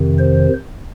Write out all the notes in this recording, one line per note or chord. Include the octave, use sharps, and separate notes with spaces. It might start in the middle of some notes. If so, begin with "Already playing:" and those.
Already playing: F2 C3 D#3
C5